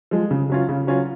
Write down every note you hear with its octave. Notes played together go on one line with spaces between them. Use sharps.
F3 G#3
C#3
F#3 C#4 F4
C#3
F#3 C#4 F4